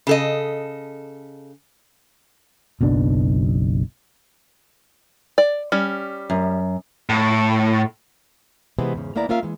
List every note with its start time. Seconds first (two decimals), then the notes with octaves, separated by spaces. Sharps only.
0.07 C#3 A4 D#5
2.81 F#1 B1 B2 D4
5.38 D5
5.72 G3 C#4
6.30 F#2
7.09 A2
8.79 C3 E3 G#3 B3
8.94 E2 G#2 C#3
9.15 D#2 A#3 B3 E4 D5 A#5
9.29 A#3 C#4 F4 A#4 E5 F5
9.43 E3 G#3